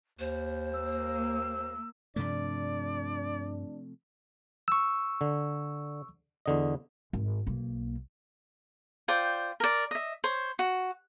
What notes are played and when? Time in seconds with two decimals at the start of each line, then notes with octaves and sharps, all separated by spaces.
0.19 D#2 C5
0.73 A#3 E6
2.16 G2 C3 F3 A3 D4 D5
4.68 C#6 E6
5.21 D3
6.46 E2 D3 D#5
7.13 G#1
7.47 B1 A#3
9.08 F4 C5 D5 G5
9.60 A#4 D5
9.91 D#5 E5
10.24 C5 C#5
10.59 F#4